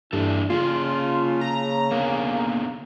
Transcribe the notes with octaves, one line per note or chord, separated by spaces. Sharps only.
G2 E3 A#3 D4 E4 A4
C#3 A#3 F4 G#4
A#5
D3 A#3 B3 G#4